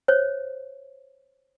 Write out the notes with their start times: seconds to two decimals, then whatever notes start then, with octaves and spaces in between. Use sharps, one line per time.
0.08 C5 C#5